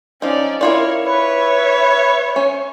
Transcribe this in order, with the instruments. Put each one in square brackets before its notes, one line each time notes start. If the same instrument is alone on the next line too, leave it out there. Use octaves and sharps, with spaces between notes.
[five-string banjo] F3 D#4 [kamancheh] C#4 D5
[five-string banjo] E4 F4 D5 [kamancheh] A#4 C#5
[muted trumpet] B4 [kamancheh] C#5 E5
[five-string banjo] C#4